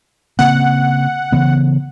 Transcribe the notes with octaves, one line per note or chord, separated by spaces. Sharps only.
C#3 A#3 C4 F#5
C#3 E3 B3